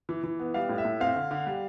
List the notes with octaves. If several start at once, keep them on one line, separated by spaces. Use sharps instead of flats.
E3
E3
B3
G3 F5
A2
E5
A2
C4 F5
D3
D3
G3